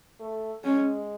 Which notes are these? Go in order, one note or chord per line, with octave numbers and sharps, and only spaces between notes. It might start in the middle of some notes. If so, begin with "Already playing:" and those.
A3
G#3 C#4